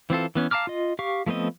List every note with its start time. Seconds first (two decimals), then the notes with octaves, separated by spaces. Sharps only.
0.10 E3 C4 F4 A4
0.35 E3 B3 C#4
0.51 F5 A5 A#5 D6 F6
0.67 F4 D#5
0.99 G4 F5 C#6
1.26 F3 A3 B3 C4 D#5